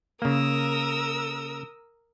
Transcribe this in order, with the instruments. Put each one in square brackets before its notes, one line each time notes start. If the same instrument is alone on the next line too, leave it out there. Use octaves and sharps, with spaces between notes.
[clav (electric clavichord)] C#3 A#3 [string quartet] A#4 D#6 E6